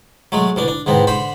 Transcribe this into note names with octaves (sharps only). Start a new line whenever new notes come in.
F#3 G#3 A3
D2 E3 D4
D4
E2 G#2 B3 C4
D3 C5 B5